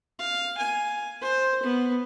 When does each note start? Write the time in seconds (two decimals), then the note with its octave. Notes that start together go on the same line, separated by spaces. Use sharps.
0.19 F5
0.58 G#5
1.21 C5
1.63 B3